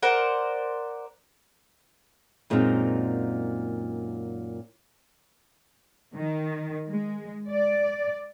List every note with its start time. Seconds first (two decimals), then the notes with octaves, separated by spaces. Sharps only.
0.03 A#4 C5 D5 F#5
2.50 F#2 A#2 G#3 C4 D#4
6.15 D#3
6.88 G#3
7.50 D5